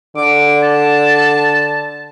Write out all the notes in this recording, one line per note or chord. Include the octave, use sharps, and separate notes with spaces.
D3 D6
A5